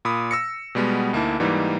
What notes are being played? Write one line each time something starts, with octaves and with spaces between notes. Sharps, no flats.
A#2 B5 D#6
E6 A#6 C#7
B2 G3 G#3 B3
D2 A#3 D#4 E4 A5
G#2 E3 G3 A#3 D#4